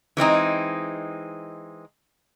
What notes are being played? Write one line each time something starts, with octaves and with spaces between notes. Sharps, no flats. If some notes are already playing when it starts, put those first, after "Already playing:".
E3 G#3 C4 D#4